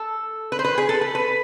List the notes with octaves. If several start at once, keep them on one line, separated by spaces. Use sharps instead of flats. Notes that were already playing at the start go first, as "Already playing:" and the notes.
Already playing: A4
B4
C5
B4
G#4
A4
B4
B4